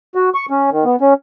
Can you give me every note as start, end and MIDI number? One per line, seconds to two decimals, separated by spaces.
0.15 0.29 66
0.34 0.46 85
0.50 0.70 61
0.71 0.84 51
0.85 0.96 59
1.01 1.14 61